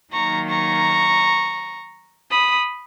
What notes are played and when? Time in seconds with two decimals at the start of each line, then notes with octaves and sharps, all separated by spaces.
0.12 D#3 F#3 A#3 D#4 A#5 C#6
0.48 A#5 C#6
2.29 B5 D#6